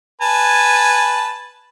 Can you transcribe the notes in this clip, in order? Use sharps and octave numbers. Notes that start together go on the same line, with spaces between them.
B4 G#5 A5